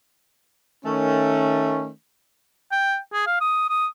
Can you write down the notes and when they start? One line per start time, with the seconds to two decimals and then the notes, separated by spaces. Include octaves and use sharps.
0.85 D#3 A3 C#4
2.72 G5
3.13 G#4
3.27 F5
3.41 D#6
3.70 D#6